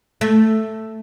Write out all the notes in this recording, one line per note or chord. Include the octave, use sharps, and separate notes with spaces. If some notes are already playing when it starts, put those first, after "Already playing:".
A3